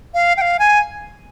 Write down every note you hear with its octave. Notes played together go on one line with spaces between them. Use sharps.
F5
G5
F5
G#5